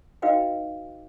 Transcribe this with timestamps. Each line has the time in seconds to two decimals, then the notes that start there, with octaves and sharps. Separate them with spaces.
0.22 D#4 F#4 B4 D#5 F5 G5